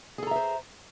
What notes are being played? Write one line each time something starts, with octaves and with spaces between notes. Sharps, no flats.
G#4 A4 C5 E5 A#5